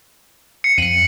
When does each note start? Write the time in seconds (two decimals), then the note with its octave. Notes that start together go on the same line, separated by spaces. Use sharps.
0.64 C7 C#7
0.78 F2 C#7 D#7 F#7